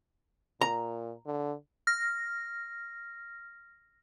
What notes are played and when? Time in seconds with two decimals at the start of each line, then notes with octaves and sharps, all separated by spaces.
0.61 A#2 A#5
1.26 D3
1.87 F6 A#6